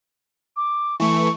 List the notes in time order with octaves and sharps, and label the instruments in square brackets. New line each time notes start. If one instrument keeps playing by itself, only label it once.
[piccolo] D6
[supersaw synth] E3 A3 [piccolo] C#6